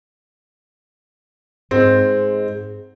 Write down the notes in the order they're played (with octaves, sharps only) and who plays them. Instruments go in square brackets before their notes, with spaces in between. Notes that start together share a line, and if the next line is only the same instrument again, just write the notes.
[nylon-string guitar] G#2 G#3 [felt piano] C4